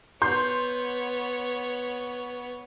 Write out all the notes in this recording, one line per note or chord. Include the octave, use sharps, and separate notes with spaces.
B3 C#5 C6 G6